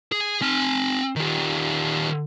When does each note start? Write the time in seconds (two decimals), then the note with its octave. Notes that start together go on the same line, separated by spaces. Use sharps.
0.12 G#4
0.42 C4 G#5
1.16 D#3 G3